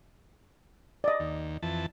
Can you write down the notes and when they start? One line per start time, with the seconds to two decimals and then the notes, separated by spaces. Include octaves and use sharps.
1.04 D5 D#5
1.20 D#2
1.62 F2 E3 A5